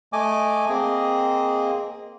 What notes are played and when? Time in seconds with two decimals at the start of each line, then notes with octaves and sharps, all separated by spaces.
0.13 A3 D#5 G#5 D6
0.69 A#3 C4 G#4 D#5